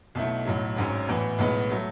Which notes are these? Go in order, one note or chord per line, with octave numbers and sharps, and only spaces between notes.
B1 B2 A3 E4
B1 A2 F#3
G#1 G#2 F#3 C#4
A2 E3 B3 F#4
B1 A2 G#3 B3
F#3 A3